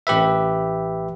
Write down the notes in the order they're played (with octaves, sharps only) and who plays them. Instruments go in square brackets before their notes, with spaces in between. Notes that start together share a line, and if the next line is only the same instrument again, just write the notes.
[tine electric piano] A1 G4 B4 E5